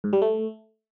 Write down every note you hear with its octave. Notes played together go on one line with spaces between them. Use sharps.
G#2
G3
A3